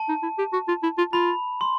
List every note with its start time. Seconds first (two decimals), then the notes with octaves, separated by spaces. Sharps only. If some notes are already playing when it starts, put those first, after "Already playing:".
Already playing: A5
0.09 D#4
0.23 E4
0.38 G4
0.53 F#4
0.68 F4
0.83 E4
0.98 F4
1.13 F4 B5
1.61 C6